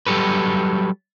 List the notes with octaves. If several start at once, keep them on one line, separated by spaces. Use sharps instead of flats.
F#3 G3 G4 A4 B4